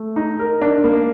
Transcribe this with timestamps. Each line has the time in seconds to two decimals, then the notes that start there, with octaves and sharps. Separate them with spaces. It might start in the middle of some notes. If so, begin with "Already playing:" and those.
Already playing: A3
0.16 D#4
0.39 A#4
0.62 D4
0.84 A#3